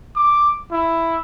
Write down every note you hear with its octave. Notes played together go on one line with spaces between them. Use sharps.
D6
E4